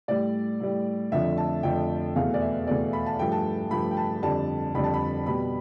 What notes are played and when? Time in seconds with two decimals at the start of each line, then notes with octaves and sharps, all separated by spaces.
0.08 A2 G3 D5
0.60 A2 G3
1.12 F2 D3 F3 A3 E5
1.37 A5
1.63 F2 D3 F3 A3 G5
2.16 E2 B2 A3 F5
2.34 D5
2.41 E5
2.67 E2 B2 A3 D5
2.93 B5
3.06 A5
3.19 G2 F3 A3 G5
3.32 A5
3.71 G2 F3 A3 B5
3.91 G5
3.97 A5
4.23 F2 D3 G3 A5
4.75 F2 D3 G3 B5
4.84 A5
4.94 B5
5.26 B2 G3 B5